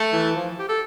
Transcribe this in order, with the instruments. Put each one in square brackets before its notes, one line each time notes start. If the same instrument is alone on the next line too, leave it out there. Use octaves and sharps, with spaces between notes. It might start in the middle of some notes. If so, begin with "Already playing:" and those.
Already playing: [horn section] A3
[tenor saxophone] E3
F3
G4
A4